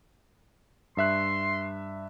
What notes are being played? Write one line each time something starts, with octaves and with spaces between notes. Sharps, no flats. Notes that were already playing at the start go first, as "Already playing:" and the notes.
G2 E5 C6 F#6